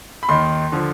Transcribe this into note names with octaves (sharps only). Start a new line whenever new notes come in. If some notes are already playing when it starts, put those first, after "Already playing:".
B5
D#2 D#3 C6
D3 F3